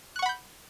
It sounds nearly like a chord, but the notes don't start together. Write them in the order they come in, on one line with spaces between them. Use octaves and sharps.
F#6 C#6 F#5 B5 G6